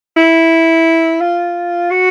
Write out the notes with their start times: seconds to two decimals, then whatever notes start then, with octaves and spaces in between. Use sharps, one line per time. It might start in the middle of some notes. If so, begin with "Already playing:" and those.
0.17 E4
1.21 F4
1.90 F#4